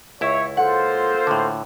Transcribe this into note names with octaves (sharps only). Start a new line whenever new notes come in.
C#2 E4 C#5 E5
A#3 F4 A4 C5 F#5
A2 D3